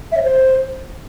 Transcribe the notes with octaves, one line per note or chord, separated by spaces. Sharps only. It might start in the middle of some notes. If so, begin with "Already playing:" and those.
E5
C#5
C5